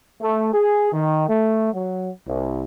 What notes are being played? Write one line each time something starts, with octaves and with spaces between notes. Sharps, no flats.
A3
G#4
D#3
A3
F#3
C2